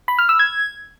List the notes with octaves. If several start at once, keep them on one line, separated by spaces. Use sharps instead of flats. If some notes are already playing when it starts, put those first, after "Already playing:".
B5
F6
E6
G#6